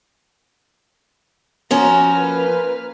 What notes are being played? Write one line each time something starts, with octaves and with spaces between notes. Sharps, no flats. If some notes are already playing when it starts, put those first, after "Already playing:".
F3 C#4 F#4 A#5
A#3 B4 F6